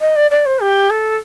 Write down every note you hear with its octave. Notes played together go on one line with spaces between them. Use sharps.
D#5
D5
D5
C5
G4
A4